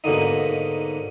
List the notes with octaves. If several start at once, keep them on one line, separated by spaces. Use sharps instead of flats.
G#2 B2 D3 A#3 D#4